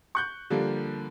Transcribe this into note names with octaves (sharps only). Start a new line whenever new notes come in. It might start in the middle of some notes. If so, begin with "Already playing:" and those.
C#6 F#6 G6
D3 F3 G3 A#3